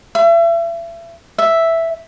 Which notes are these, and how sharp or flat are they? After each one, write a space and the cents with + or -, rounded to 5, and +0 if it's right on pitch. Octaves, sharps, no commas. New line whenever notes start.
E5 +35
E5 +0